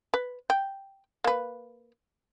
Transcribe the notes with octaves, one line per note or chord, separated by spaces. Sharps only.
B4
G5
A#3 B4